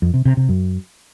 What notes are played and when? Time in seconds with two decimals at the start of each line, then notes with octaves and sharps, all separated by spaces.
0.02 F2
0.14 C3
0.25 C3
0.37 C3
0.49 F#2